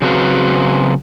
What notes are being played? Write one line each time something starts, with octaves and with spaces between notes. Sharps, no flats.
C#3 F#3 C4 F#4 B4 F5